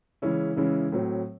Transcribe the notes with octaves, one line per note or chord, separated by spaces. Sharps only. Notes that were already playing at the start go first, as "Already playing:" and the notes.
C#3 E3 G#3 C#4 E4
C#3 E3 G#3 C#4 E4
A2 F#3 C4